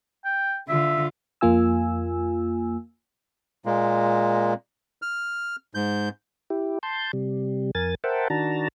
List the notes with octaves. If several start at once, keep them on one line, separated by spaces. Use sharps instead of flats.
G5
D3 F4 E5
F2 A#3 F4 G#5 E6
A#2 G#3 A#3
F6
G#2 G6
E4 G4
A5 C6 G6
C3 G3
F2 A#4 G#5 A6
A#4 C5 E5 F#5 G5 A5
D#3 D4 F#4 A5 A#5